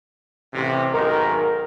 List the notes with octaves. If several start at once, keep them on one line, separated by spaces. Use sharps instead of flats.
A1 C3
B1 G#2 D#3 A#4